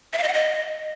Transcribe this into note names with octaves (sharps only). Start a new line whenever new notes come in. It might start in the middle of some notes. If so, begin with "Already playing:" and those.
E5
F5
D#5
F#5
D#5